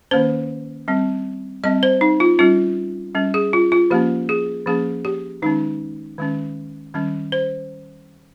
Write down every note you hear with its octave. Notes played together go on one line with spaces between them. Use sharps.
D#3 A#3 C#4 C5
G3 C4
G3 C4 D#5
C5
D#4
F4
G3 C#4 F4
G3 C#4
G#4
F4
F4
F3 A#3 C#4 G4
G#4
F3 A#3 C#4 G#4
G4
D#3 G#3 C#4 D#4
D#3 G#3 C#4
D#3 G3 C#4
C5